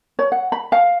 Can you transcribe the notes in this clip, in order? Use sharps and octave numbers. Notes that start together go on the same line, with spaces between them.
C#5
F#5
B5
F5